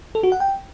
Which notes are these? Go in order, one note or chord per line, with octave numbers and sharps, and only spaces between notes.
A4
F#4
F#5
G5